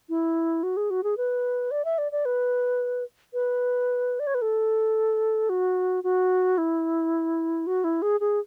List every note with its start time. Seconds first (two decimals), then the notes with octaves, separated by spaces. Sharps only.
0.09 E4
0.63 F#4
0.77 G#4
0.90 F#4
1.04 G#4
1.17 B4
1.71 D5
1.85 E5
1.98 D5
2.12 D5
2.25 B4
3.33 B4
4.19 D5
4.27 C#5
4.34 B4
4.42 A4
5.49 F#4
6.04 F#4
6.58 E4
7.67 F#4
7.84 E4
8.02 G#4
8.20 G#4